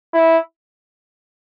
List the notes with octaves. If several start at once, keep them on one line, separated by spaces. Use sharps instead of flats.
E4